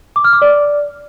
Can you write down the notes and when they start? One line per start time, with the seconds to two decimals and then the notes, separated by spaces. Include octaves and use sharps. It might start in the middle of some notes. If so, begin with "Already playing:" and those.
0.16 D6
0.24 F6
0.33 D6
0.42 D5